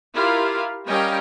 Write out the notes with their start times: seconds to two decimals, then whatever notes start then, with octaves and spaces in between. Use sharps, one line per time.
0.14 E4 F4 G4 A#4 F5
0.86 G3 C#4 A#4 D#5 F5 G5